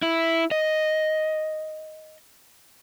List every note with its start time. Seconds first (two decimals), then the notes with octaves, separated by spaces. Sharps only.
0.02 E4
0.51 D#5